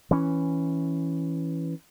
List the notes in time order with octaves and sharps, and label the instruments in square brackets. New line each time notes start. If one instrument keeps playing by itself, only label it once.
[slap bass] E3 C#4